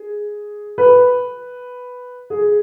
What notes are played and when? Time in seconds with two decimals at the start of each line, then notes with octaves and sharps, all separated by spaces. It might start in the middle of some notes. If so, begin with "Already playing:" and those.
Already playing: G#4
0.78 B4
2.30 G#4